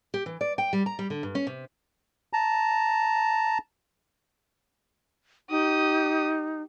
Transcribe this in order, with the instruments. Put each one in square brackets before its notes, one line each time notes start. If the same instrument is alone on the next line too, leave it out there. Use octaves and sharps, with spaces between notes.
[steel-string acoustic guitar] G4
E3
D5
G5
G3
A#5
G3
D3
G2
C#4
C3
[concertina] A5 A#5
[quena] D#4 [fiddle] G4 D#6